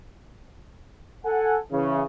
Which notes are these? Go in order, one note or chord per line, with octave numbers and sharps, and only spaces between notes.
A4 F#5 G#5
C#3 E3